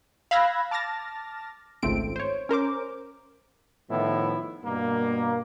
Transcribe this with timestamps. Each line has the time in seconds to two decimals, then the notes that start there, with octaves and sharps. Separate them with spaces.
0.31 F5 B5 E6 F#6 G#6 A#6
0.71 A5 D6 F6 A6 A#6
1.83 G#1 C#2 A3 C4 D7
2.16 C5 C#5
2.49 C#4 A#4 C5 D6
3.90 A2 D#3 F3 B3 E4
4.65 G2 B2 A#3